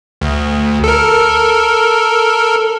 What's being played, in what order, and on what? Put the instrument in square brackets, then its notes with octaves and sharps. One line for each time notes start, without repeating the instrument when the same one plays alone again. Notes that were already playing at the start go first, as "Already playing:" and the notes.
[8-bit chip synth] D2
A4 A#4